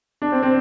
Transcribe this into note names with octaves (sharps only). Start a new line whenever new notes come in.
D4
C4
C4